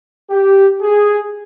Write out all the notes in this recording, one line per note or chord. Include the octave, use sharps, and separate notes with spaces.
G4
G#4